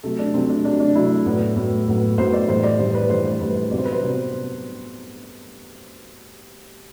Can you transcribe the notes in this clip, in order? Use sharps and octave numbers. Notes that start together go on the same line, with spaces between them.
C3 F#3 A3 A4
D4
C3 F#3 A3 C4
D4
C3 F#3 A3 D4
D4
C3 F#3 A3 E4
A2 F#3 B3
A2 F#3 B3
A2 F#3 B3
A2 F#3 B3 C5
D5
A2 E3 G3 C5
D5
A2 E3 G3 C5
B4
A2 E3 G3 C5
C5
A2 E3 G3 B4
C5
C3 F#3 B3 D5
C5
B4
C5
C3 F#3 B3